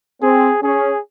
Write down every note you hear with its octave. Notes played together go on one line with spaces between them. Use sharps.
C4 G#4
C#4 G#4